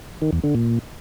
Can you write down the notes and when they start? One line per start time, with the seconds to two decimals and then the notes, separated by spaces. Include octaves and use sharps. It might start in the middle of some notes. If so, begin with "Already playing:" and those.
0.22 D#3
0.33 E2
0.44 D3
0.55 A#2